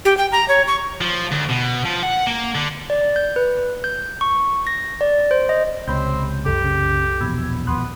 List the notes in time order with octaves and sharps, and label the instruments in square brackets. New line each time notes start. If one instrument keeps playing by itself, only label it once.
[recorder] G4
G5
A#5
C#5
C#6
[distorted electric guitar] F3
D2
B2
F3
F#5
A#3
D3
[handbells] D5
G6
B4
G6
C#6
A#6
D5
C5
D#5
[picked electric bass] C#2 C3 [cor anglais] C4 [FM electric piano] C#5 B5 G6
[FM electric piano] C2 F#2 A4 [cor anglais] G4
[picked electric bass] C#3
[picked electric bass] A#1 E2 B2 [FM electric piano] B5 E6 G#6
[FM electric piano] D#2 C6 F#6 [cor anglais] B3